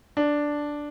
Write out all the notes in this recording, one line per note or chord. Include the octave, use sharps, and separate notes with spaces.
D4